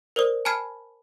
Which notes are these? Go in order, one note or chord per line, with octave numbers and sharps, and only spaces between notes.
A#4 C5 D5 D#6
G#5 A5 B5 F6 G#6 C7